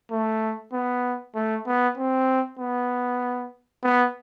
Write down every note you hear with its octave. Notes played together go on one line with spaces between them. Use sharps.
A3
B3
A3
B3
C4
B3
B3